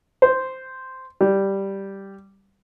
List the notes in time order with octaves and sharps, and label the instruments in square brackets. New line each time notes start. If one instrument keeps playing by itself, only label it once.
[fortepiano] C5
G3